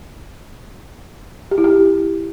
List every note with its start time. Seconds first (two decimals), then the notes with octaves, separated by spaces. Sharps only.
1.51 G4
1.58 E4
1.64 G4